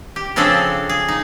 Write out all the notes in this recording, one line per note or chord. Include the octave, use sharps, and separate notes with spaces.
G4
C#3 F3 C4 D4 G#4 A4
G#4
D#4